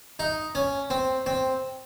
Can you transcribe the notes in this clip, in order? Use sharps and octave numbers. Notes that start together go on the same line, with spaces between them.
D#4
C#4
C4
C4